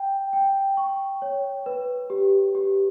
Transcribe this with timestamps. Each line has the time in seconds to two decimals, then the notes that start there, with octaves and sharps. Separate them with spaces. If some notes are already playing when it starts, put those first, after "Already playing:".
Already playing: G5
0.33 G5
0.77 C#6
1.22 C#5
1.66 B4
2.10 G4
2.55 G4